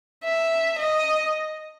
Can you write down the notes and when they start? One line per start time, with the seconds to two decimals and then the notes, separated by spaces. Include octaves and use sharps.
0.24 E5
0.79 D#5